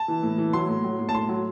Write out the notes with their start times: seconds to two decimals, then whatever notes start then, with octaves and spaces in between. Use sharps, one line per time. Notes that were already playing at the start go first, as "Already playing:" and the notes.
Already playing: A5
0.08 E3
0.23 A2
0.38 E3
0.53 F#3 C6
0.69 A2
0.84 F#3
0.99 A2
1.09 A5
1.14 A2 C6
1.29 F#3